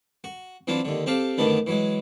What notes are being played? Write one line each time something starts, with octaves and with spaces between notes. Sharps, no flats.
F#4
E3 F#3 C4 D4 F4
D#2 D3
C4 G4 A4 F5
F#2 D3 D#3 A3 B3 D4
E3 F#3 G#3